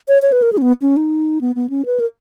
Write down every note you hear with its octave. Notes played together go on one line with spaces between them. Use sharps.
C#5
C#5
B4
A#4
G#4
C#4
B3
C#4
D#4
B3
B3
C#4
B4
A#4